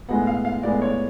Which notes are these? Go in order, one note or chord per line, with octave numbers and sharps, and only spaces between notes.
A2 G#3 B3 F#5
F5
F5
A2 G#3 B3 D5
C#5